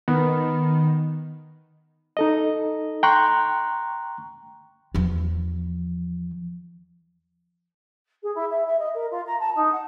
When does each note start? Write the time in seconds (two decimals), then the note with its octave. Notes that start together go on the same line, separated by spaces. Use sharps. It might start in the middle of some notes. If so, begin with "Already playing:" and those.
0.08 D#3 B3
2.17 D#4 A4 D#5
3.03 G5 A#5 C6 C#6 F#6
4.94 E2 F3
8.23 G#4
8.34 E4
8.50 E5
8.66 E5
8.79 D#5
8.94 A#4
9.11 F4
9.26 A#5
9.39 A5
9.55 D#4
9.71 F#5